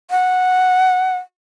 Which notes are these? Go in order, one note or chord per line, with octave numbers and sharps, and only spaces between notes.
F#5